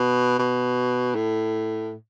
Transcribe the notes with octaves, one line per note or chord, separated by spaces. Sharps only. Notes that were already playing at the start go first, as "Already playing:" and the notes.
Already playing: B2
B2
A2